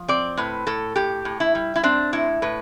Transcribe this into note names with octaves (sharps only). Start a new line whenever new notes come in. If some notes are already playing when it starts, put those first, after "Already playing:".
Already playing: F3
C4 D5
A2 B4
A2 A4
A2 G4
A2
E4
G3
E4
C4 D4
A2 E4
A2 B4